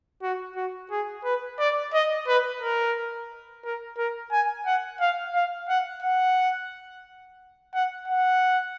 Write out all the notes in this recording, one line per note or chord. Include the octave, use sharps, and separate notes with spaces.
F#4
F#4
G#4
B4
D5
D#5
B4
A#4
A#4
A#4
G#5
F#5
F5
F5
F#5
F#5
F#5
F#5